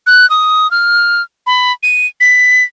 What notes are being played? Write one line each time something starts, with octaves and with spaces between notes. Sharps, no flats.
F#6
D#6
F6
B5
D#7
B6